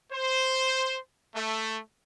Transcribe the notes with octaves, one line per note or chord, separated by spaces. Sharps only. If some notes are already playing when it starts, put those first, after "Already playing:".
C5
A3